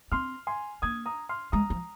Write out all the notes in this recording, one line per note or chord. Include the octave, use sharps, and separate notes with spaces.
C4 C6 F6
G#5 C6
A#3 D#6 G#6
A#5 D#6
C6 F6
G#3 A#5 D#6
F3